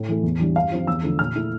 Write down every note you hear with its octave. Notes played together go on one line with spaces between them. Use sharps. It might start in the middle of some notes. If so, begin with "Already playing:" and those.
Already playing: A2
E3 A3
E2
E3 G3 D4
G2 F5
F3 C4 F4
E2 E6
D3 F3 A3
A#2 F6
A3 E4